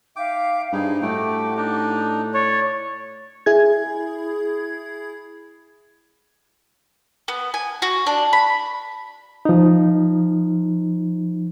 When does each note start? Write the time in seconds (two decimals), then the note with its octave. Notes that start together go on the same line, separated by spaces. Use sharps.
0.16 D#4 E5 F5 G5 D6
0.72 G2 D#4 E4 G#4 C5
1.02 A2 A3 F#4 G4 G5 D6
1.57 D4 D#4
2.34 C#5 D5
3.46 E4 G#4 G#6
7.28 B3
7.54 G#5
7.82 F#4
8.06 D4
8.33 B5
9.45 F3 D#4